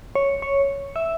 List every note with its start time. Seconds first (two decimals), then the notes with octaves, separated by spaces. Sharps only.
0.15 C#5
0.42 C#5
0.96 E5